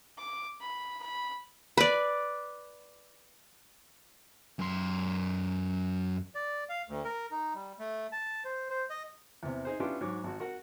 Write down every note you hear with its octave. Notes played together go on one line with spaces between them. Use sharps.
D6
B5
B5
B4 D5
F#2 C6
D5
F5
D2
A#4
D#4
G3
A3
A5
C5
C5
D#5
E2 C3
D#4 G#4 C5
B3 C#4 D4 E4 F4 G4
G#2 F#3 C#5 D6
G#1 F#4
F#4 A#4 F#5